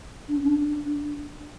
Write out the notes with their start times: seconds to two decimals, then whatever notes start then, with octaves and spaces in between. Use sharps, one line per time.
0.28 D4
0.37 C#4
0.45 D4